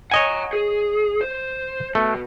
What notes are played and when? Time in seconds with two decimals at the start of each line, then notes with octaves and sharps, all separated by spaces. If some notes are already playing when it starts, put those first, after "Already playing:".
0.11 C#5 D#5 F#5 G#5 A#5
0.53 G#4
1.21 C5
1.95 B2 A3